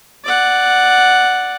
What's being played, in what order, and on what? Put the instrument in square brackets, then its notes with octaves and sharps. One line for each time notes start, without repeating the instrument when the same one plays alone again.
[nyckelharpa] D5 F#5